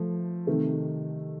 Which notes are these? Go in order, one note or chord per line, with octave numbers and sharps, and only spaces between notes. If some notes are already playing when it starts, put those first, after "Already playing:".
Already playing: F3 A3
C3 D#3 A3